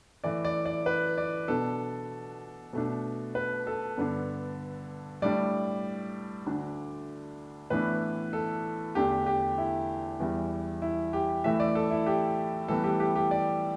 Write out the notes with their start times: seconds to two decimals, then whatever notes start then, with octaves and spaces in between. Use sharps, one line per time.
0.24 A2 E3 A3 D5
0.45 D5
0.66 D5
0.86 B4
1.18 D5
1.48 B2 B3 D4 A4
2.73 B2 A3 D4
3.35 B4
3.67 A4
3.97 G2 D3 B3 D4
5.22 A2 G3 D4 D5
6.46 D2 D3 A3 D4
7.70 A2 E3 B3 D4 B4
8.33 A4
8.95 E2 D3 A3 D4 G4
9.26 G4
9.58 E4
10.20 E2 E3 G3
10.82 E4
11.13 G4
11.44 A2 E3 A3 E5
11.60 D5
11.75 A4
11.91 E4
12.06 G4
12.68 A2 E3 G3 B3 A4
12.84 G4
13.00 G4
13.16 G4
13.31 D5